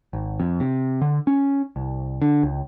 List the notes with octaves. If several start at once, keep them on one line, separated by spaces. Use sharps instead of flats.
G#1
F2
C3
D3
C#4
C2
D3
C#2